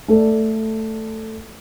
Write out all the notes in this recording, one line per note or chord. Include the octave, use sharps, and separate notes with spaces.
A3 A4 D5